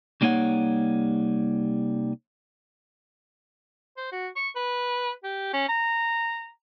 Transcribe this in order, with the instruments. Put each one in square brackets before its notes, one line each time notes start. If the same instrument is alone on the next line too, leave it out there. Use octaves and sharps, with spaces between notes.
[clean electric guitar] C2 G3 A#3 D#4 C#5 F#5
[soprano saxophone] C5
F#4
C#6
B4
G4
C#4
A#5